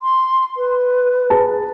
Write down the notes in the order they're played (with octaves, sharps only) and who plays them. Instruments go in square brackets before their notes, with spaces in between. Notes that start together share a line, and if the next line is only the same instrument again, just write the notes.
[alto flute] C6
B4
[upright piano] G#4 B4 A5